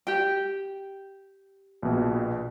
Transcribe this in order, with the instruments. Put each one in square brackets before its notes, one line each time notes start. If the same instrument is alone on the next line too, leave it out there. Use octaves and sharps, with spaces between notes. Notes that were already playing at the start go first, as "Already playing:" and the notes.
[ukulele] G4 G5
[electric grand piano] A#1 B2